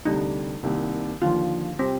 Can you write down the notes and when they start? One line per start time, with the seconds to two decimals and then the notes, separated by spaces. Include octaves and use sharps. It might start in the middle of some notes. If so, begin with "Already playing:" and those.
0.05 D2 C3 G3 D4 D#4
0.63 C2 C3 D#3 A#3
1.22 D#2 D3 F3 F4
1.79 C3 G3 C4